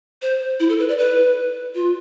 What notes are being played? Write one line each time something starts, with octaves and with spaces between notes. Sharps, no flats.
C5
E4
A4
B4
D5
B4
F4